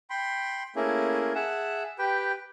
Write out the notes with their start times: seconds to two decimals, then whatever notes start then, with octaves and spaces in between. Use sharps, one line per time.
0.10 G5 B5 C6
0.76 A3 A#3 C#4 E4 G#4 A#4
1.35 G#4 E5 F#5 A5
1.99 G4 B4 G5